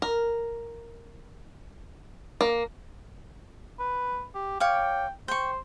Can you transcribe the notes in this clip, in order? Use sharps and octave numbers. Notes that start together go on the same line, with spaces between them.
A#4
A#3
B4
G4
C#5 F5 G5 D6
C5 G5 C#6